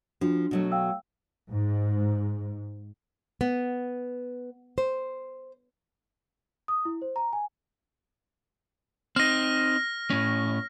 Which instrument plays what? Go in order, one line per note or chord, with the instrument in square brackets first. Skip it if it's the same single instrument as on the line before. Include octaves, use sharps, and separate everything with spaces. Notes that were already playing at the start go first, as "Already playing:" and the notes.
[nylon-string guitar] F3 [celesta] D4 F#4
[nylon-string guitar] B2 F#3 A3
[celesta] F5 G5 E6
[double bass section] G#2
[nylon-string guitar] B3
C5
[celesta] D#6
E4
C5
A#5
G#5
[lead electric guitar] C4 D#4 [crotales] F6 A#6
[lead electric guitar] A2 C#4